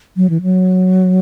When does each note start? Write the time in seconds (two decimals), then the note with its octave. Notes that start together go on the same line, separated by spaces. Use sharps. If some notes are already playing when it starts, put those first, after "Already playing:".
0.17 F#3
0.30 E3
0.42 F#3